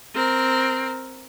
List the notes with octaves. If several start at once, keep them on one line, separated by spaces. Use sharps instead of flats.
C4 A#4